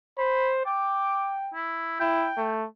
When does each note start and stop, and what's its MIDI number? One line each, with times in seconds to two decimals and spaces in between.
0.18 0.64 72
0.18 0.50 83
0.66 1.52 79
0.66 1.32 86
1.54 1.98 64
2.00 2.31 64
2.00 2.47 79
2.37 2.66 57